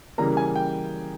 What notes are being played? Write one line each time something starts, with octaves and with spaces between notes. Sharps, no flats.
C#3 E3 G3 A#3 A#5
G#5
G5